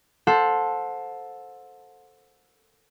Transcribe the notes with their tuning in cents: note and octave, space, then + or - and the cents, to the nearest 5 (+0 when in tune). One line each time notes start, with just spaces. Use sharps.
A4 +0 C5 +5 F#5 -35